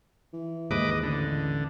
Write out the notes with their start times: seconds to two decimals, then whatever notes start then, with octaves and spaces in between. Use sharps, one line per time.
0.33 E3
0.71 D#2 G#2 B4 D#5 D6
0.91 D#5
1.03 A1 D3